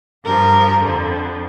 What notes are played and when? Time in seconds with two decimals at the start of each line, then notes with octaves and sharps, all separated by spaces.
0.24 G2 F3 A#4
0.81 F2 D3 F3